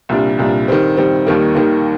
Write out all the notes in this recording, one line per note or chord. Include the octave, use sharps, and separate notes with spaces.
C2 A#2 G3 D4
C2 A#2 G3 D4
D#3 G3 C4
D#3 G3 C4
D#2 D#3 G3 A#3
D#2 D#3 G3 A#3